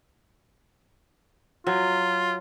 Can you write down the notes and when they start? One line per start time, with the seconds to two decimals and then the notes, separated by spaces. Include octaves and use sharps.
1.67 F#3 F4